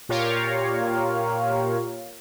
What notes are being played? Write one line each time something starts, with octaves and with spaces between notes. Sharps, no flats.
A#2 F4 G4 A#4 C#5 F5